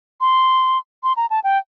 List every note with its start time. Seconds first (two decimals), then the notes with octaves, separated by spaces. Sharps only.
0.21 C6
1.03 C6
1.17 A#5
1.30 A5
1.44 G5